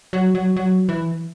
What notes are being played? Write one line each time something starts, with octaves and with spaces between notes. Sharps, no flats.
F#3
F#3
F#3
E3